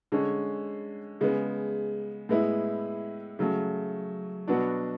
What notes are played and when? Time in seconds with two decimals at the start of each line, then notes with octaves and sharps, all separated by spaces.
0.12 D3 G#3 C#4
1.21 C#3 G#3 B3
2.29 A2 G#3 B3 E4
3.39 C#3 F#3 A3
4.48 B2 F#3 B3 D4 F#4